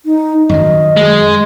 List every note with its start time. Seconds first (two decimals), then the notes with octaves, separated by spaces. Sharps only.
0.06 D#4
0.49 F#2 D#3 F#3 D#5
0.97 G#3